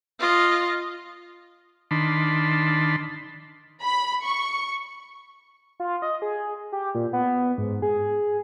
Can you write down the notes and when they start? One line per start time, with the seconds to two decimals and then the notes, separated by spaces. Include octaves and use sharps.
0.19 F4 D#5
1.91 D#3 D4 A5 B5 C6
3.83 B5
4.25 C#6
5.80 F4
6.02 D#5
6.22 G#4
6.72 G4
6.95 A#2
7.13 B3
7.58 G#2
7.82 G#4